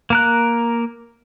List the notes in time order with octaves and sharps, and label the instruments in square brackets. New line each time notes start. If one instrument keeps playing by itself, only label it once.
[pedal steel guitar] A#3 A#4 F#6